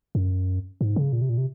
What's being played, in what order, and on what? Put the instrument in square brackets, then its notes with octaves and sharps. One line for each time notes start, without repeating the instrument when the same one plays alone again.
[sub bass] F#2
G#2
C#3
A#2
C3
A#2
C3